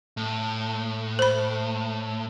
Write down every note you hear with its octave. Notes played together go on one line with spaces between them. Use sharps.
A2
C5 B5